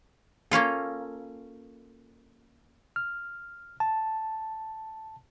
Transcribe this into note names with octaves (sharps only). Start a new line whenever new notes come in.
A#3 C#4 F4 A4
F6
A5